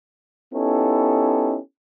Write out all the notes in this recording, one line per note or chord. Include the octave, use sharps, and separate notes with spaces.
B3 C#4 D#4 E4 G4 A4